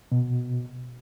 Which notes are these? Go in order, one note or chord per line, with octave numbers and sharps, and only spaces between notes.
B2